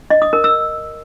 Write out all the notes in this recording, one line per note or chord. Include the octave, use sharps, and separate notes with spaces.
D#5
D#6
A#4
E6